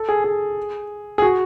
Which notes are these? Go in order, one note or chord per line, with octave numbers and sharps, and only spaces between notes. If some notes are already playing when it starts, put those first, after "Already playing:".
Already playing: A4
G#4
G#4
G#4
F#4